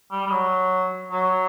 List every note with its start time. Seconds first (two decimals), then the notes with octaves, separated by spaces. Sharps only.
0.12 G3
0.26 G3
0.31 F#3
1.11 F#3